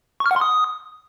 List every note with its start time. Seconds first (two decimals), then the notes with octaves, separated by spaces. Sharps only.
0.20 C#6
0.26 F6
0.31 F#5
0.36 C6
0.41 D#6